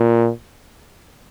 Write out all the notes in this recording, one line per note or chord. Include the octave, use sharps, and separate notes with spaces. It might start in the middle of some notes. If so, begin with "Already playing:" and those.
Already playing: A#2